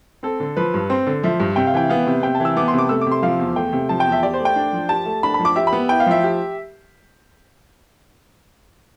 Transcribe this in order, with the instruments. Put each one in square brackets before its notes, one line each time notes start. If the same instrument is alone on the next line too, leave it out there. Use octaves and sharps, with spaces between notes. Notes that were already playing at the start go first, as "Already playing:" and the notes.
[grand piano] C4 [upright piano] A4
[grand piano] D3
[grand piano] F3 [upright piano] B4
[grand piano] G2
[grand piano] C4 [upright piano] C5
[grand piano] D3
[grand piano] F3 [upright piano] E5
[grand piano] G2
[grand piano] C3 [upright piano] G5
[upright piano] F5
[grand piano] E3 [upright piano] G5
[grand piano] B3 [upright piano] F5
[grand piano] C3
[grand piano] C3 [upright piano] G5
[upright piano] A5
[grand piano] E3 [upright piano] E6
[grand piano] B3 [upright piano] D6
[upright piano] C6
[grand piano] C3 [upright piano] D6
[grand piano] A3 [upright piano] E6
[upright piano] D6
[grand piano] C3 [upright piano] C6
[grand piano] F3 [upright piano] F5
[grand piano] E2
[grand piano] A3 [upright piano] G5
[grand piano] C3
[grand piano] F3 [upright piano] A5
[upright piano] G5
[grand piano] E2
[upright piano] E5
[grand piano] G4 [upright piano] D5
[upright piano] C5
[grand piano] A3
[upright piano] G5
[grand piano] D4
F3
[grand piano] G4 [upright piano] A5
[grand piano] A3
[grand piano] D4 [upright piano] B5
[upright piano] B5
[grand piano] F3
[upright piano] D6
[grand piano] G4 [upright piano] E5
[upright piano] B5
[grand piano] B3
[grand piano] E4 [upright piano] G5
[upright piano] F5
[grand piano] F3 [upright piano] E5
[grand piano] G4